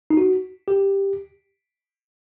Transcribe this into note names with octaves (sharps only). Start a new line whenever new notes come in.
D#4
F#4
G4